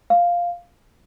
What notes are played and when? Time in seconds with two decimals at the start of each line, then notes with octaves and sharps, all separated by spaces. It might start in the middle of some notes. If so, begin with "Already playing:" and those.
0.10 F5